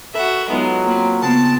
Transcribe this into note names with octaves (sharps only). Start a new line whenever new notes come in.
F#4 A4 B4 E5
F#3 G#3 B3 D#4 F4
A#3 C4 F4 B4
C#3 B3 C4 A5